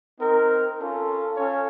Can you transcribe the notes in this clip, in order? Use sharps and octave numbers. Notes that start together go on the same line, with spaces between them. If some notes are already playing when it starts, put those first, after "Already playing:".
C4 D#4 A#4
C#4 F4 A4
C#4 A4 C#5 F5